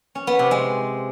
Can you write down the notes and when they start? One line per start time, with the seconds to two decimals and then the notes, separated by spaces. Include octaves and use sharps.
0.15 C#4
0.27 B3
0.39 C3
0.51 G#3